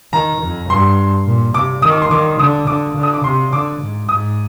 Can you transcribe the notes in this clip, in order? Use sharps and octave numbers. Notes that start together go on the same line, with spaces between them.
D#3 A#5
F2
G2 C6
A#2
C3 D6
D#3 D#6
D6
C6
D#3 D6
D3 D#6
D3 D6
D3
D#6
D6
C3 C6
D3 D6
G#2
G#2 D#6